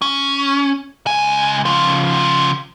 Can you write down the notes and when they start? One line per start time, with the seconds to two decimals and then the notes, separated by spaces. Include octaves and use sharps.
0.02 C#4
1.06 C#2 G#5
1.65 C#3 F3